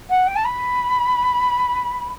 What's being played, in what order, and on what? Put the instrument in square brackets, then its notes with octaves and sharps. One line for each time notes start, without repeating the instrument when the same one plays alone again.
[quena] F#5
G5
A5
B5